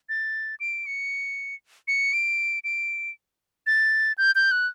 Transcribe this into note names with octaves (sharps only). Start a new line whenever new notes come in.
A6
D7
C#7
C#7
D7
D7
A6
G6
G6
F#6